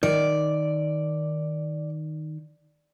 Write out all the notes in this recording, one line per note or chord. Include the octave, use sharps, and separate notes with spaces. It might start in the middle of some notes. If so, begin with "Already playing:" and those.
D#3 D5